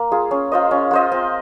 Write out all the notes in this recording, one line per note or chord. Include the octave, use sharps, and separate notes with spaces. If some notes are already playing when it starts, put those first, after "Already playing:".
Already playing: A#3
F4 G#4
C#4
F4 C5 D#5
C#4
F4 C5 D#5
C4